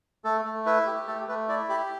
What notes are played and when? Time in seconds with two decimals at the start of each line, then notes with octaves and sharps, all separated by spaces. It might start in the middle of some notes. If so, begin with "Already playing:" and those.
0.24 A3 A4
0.45 A3
0.66 E4 B4
0.87 G4
1.07 A3 A4
1.28 A3 B4
1.48 E4 D5
1.69 G4 B5